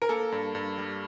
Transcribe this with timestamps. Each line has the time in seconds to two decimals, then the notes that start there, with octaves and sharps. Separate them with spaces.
0.02 A#4
0.09 A#3 A4
0.32 G2
0.55 G2
0.78 G3